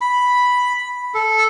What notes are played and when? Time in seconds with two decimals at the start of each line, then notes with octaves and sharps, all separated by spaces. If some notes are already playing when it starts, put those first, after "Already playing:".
0.01 B5
1.14 A4